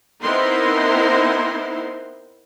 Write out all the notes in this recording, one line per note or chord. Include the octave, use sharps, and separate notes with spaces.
B3 C4 D#4 E4 A#4 C6